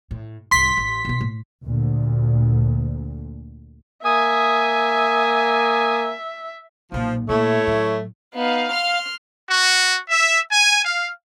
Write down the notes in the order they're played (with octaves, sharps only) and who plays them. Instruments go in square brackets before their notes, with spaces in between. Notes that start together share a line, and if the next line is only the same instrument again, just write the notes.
[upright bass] A2
[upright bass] C2 G#2 [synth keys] C6 B6
[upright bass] A1
B2 D#4
A2
[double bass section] D2 A#2
[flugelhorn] A#3 [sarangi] E5 [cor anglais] G#5 [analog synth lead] D#6
[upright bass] B1 A#2 [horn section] F3
[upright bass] A#2 [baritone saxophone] A3 [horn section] E4 C#5
[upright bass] A2 F#3
[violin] B3 D#4 [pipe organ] F5
[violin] C6 F6
[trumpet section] F#4
E5
G#5
F5